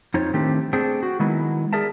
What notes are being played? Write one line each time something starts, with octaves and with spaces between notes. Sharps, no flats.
F2 D#4 F4 C5 C#5
A2 D#3 A3 C4 D4 G4
A3 C4 D4 G#4 C5
F#4
D#3 F#3 G#3 B3 E4
G#4 A#4 D5 E5 A5